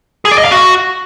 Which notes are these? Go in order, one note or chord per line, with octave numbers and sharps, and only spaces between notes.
G#4
D5
D#5
F5
F#4